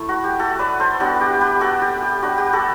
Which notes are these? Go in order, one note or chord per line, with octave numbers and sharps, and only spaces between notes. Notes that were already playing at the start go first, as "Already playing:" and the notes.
Already playing: A3 E4 A4
F#4
G4
F#4 A4
B4 D5
A4 C5
G3 B3 D4 F#4
G4
G4 B4
F#4 A4
G4
G4
G3 D4 F#4
G4
F#4 A4